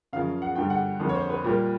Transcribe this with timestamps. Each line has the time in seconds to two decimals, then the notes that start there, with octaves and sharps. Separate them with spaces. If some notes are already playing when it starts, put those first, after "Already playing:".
0.13 F#2 C#3 F3 F5
0.42 F#5
0.55 G2 D3 G3 G5
0.70 F#5
1.00 F2 D3 F3 A#3
1.09 C#5
1.15 C5
1.30 B4
1.44 A#2 G3 A#3